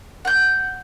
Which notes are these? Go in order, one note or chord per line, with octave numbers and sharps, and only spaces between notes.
F#5 G6